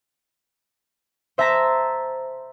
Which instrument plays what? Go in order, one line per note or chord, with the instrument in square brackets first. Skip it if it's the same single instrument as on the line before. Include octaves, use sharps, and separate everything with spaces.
[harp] C5 E5 A5 A#5 A#6 B6